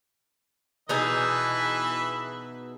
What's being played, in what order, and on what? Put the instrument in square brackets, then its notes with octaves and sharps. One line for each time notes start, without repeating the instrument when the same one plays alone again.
[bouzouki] B2 D#4 G#4 [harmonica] E3 B4 E5